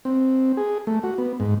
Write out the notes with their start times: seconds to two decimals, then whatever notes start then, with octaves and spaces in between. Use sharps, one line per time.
0.05 C4
0.57 G#4
0.87 A3
1.03 F#4
1.18 B3
1.40 G#2